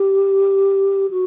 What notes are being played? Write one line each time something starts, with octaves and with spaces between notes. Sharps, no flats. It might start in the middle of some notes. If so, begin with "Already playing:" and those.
Already playing: G4
F#4